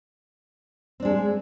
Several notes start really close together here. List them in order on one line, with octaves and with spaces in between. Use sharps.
C4 D4 G#3